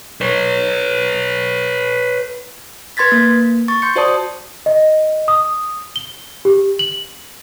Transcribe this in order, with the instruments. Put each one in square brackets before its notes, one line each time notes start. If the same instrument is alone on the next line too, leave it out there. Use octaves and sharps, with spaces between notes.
[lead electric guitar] B4 C#5
[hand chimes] B4 C6 G#6 A6 B6
A#3
C#6 A6
C6 G6 C#7
F#4 C5 D5 A5 D#6
[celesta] D#5
D#6
G7
G4
F#7